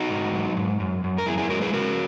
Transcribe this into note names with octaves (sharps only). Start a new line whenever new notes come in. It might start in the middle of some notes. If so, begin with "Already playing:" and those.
Already playing: D#4 F#4
G#2
F#3
G#2
F#2
F#2
A#4
F#2 E4 G#4
E4 G#4
G#3 F#4 A#4
G#4 B4
C#3 F#4 A#4